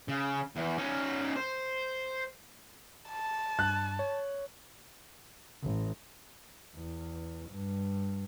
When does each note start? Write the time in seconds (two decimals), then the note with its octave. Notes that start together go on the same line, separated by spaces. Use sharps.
0.08 C#3
0.57 E2
0.78 C#4 D#4
1.36 C5
3.10 A5
3.59 G2 F#6
3.99 C#5
5.62 A1
6.76 E2
7.50 G2